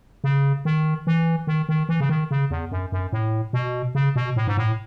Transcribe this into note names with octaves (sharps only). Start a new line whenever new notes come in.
C#3
D#3
E3
D#3
D#3
E3
C#3
D#3
C#3
E2
F#2
F#2
A2
B2
C#3
B2
A2
G#2
A2